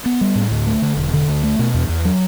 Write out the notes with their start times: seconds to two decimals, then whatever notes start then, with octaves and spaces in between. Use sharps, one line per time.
0.06 B3
0.21 G3
0.36 A2
0.51 D2
0.67 A3
0.82 D3
0.97 E1
1.13 D3
1.28 D2
1.43 A3
1.59 B2
1.74 E2
1.89 E2
2.05 F#3